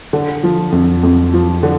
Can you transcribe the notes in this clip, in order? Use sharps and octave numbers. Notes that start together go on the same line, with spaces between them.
D3
F3
F2
F2
F3
D3